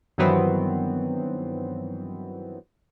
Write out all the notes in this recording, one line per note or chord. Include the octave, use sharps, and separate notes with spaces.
G2 D#3 E3 F#3 B3 C4